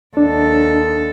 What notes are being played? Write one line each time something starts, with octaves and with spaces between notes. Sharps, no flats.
D#2 D4 A4